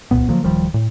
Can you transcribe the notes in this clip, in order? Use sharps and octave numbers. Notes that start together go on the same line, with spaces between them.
D1 C2 A#2 B3
D3 F3 F#3 A#3
D1 D#3 F3 G3
A2